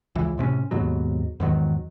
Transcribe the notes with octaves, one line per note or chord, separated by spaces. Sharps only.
C#2 E3
A2 C3 B3 C#4
D#2 G#2 B2 F#3
E2 G#2 D#3 F#3